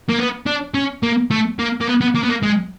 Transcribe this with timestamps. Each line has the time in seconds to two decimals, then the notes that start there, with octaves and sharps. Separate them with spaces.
0.09 A#3
0.19 B3
0.47 D4
0.74 C#4
1.03 A#3
1.31 A3
1.59 A#3
1.81 A#3
1.88 B3
2.01 B3
2.15 A#3
2.24 B3
2.29 A#3
2.43 G#3